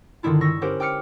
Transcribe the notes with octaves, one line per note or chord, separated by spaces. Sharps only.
G2 D3 D#3 G#3 E4 F4
C#6 E6 A#6
C#4 G4 A#4 C5 F#5
G5 D6 F6 C#7